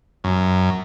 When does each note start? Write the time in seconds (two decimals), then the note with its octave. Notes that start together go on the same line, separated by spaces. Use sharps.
0.24 F#2